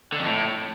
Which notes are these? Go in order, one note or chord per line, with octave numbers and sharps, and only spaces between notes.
D3
F2
A2